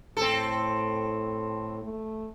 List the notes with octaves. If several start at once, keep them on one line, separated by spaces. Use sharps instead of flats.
A2 C4 A4
A3